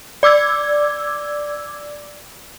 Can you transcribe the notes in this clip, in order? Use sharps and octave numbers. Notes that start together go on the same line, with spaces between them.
D5 D6 E6 G#6